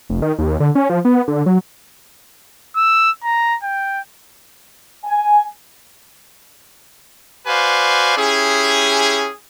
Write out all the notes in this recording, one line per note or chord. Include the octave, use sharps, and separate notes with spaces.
F1
D#3
D#2
D3
C#4
F3
B3
D3
F#3
E6
A#5
G5
G#5
F#4 B4 C5 D5 F5 G#5
C#4 E4 G4 G#4